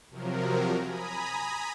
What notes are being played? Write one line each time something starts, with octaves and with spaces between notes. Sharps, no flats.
C3 F3 F#3 A#4
G#5 A#5 B5 D#6